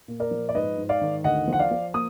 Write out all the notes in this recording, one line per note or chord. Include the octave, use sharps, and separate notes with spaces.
A#2
A#4 D5
F3
D5
G#2 B4 D#5
G#2
D5 F5
D#3
D2 D#5 F#5
F3 F#5
D5 F5
F3
A#3 D#6